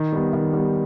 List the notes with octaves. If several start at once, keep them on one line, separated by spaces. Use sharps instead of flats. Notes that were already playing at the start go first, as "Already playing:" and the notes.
Already playing: D#3
G3 B3
D#3
G3 B3